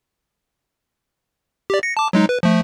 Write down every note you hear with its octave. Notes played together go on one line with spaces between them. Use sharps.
G4 D5
A#6 C#7
A5 D6
F#3 G#3 D#4
B4
F3 A3